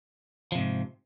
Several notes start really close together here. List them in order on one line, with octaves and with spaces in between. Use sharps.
F3 C3 G#2